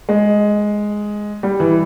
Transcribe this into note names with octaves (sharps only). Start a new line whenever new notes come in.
G#3
G3
E3